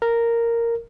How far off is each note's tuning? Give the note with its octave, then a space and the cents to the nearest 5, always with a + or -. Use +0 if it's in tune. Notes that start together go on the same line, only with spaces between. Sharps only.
A#4 -5